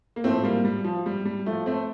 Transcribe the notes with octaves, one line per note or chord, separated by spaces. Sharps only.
A#3
A2 F3 A3 C4
G3 A#3
G3
F3
G3
G3
F3 A3
A3 C4